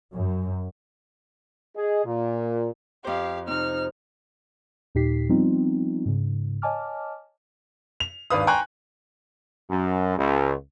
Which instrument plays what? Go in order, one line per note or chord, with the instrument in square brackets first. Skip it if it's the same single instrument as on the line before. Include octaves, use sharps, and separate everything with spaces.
[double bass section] F#2
[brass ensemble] G#4 D#5
A#2
[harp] F2 C5 [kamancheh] G4 F5
[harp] C3 C4 [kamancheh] D#4 F6
[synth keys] D#2 A#2 D#4 G4 B6 C7
F3 G3 B3 C4 D#4 F4
G#2 C#3
C#5 D#5 G#5 A5 D6 F6
[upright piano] F7
G#1 D#2 D4 B4 F5 D#6
G5 G#5 A#5 C6 C#6 F#6
[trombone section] F#2
C#2